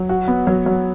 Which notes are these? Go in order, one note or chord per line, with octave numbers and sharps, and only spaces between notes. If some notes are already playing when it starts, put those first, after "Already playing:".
Already playing: F#3
F#4
B3
F#3
F#3